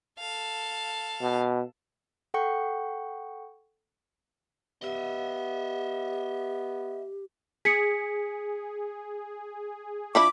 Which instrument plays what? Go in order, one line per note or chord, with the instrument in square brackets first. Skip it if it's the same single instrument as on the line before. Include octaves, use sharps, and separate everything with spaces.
[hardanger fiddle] A4 F5
[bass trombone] B2
[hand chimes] A4 F#5 G5 C#6 C#7
[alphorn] B3 [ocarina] G4 [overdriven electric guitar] D#5 E5
[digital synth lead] G#4 [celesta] B6 C#7
[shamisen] F3 D4 E4 [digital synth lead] B5 [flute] D6